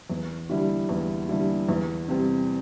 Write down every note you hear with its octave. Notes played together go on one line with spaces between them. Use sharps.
E2
D3 G3 E4
E2
D3 G3 E4
E2
C3 G3 C4